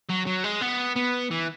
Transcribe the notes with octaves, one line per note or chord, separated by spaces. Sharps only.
F#3
F#3
G#3
B3
B3
E3